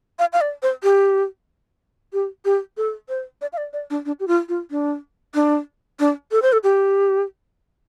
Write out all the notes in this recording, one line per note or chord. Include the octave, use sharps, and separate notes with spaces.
F5
F5
D5
C5
G4
G4
G4
A4
C5
D5
F5
D5
D5
D4
D4
G4
F4
F4
D4
D4
D4
A4
C5
A4
G4